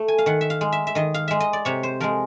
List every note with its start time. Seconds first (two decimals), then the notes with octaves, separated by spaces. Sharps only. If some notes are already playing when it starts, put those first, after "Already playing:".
Already playing: A3
0.08 G#5
0.18 F5
0.26 D#3 F#5
0.41 E5
0.50 F5
0.61 G#3
0.72 E5
0.87 E5
0.95 D#3 D#5
1.14 F5
1.28 G#3 E5
1.40 D#5
1.53 D5
1.65 C3 C#5
1.83 C5
2.00 F3 G#3 A#4